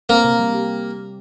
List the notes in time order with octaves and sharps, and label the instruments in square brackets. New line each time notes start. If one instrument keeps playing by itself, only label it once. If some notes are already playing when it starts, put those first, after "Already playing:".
[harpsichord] A#3 [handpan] C4
[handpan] C3
G3
G4